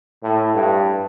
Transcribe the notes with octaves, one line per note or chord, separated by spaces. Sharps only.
A2
G2